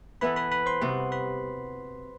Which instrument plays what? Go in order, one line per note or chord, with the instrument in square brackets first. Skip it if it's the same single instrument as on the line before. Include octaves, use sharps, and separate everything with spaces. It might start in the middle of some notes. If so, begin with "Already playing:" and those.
[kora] E3 B3 E4 A4 [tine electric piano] B4 B5
[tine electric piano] B4 B5
B4 B5
C5 C6
[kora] C3 G3 B3 F#4
[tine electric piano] B4 B5